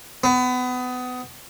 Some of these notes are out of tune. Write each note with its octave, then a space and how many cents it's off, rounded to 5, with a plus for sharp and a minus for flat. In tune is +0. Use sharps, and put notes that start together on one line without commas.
B3 +25